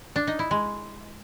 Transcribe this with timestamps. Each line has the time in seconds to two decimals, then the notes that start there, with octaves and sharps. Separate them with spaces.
0.16 D4
0.27 D#4
0.39 E4
0.51 G#3